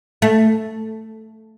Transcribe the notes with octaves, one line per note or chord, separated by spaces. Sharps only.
A3